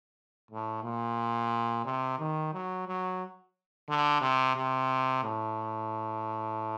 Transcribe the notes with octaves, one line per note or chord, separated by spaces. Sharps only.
A2
A#2
C3
D#3
F#3
F#3
D3
C3
C3
A2